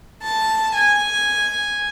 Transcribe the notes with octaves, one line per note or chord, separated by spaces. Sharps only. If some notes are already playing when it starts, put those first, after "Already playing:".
A5
G#5